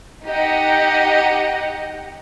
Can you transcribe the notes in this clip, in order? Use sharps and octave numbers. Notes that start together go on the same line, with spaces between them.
D#4 G4 D#5 F#5